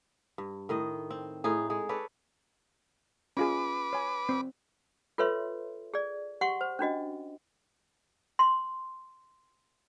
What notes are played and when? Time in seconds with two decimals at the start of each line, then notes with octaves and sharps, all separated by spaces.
0.38 G2
0.69 A2 D#3 D#5
1.10 C4
1.44 A2 D#4 G#4
1.70 G#3 G#4
1.89 A4 B4 C#5 D5
3.37 C#4 F4 G#4 B4 D6
3.93 C#5 G#5
4.29 C4
5.18 F4 A4 B4 C#5 E5 C6
5.94 G#4 D5
6.41 G4 F#5 C6 C#6
6.61 C5
6.79 C#4 D4 F#4 D#5
8.39 C6